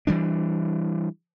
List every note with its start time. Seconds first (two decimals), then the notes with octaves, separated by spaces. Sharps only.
0.07 E3 G3 D4